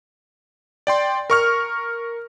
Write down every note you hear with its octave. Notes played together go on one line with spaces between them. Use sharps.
D5 G5 C6
A#4 C#6 F6